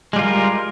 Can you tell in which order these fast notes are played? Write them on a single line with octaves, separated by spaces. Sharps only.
G#3 G3 F4 A#4